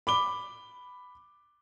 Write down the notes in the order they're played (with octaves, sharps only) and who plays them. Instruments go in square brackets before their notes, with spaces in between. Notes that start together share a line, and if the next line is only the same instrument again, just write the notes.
[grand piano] B5 D6 G7